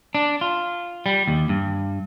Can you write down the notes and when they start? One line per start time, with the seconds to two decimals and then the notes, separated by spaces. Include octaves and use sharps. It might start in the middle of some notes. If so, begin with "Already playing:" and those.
0.15 D4
0.41 F4
1.06 G3
1.28 D#2
1.49 G2